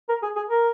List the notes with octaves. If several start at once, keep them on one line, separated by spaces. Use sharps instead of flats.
A#4
G#4
G#4
A#4